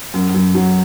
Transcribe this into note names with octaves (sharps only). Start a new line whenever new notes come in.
F#2
F#2
F#3